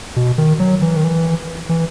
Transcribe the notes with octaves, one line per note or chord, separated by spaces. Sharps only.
B2
D#3
F#3
E3
D#3
E3
E3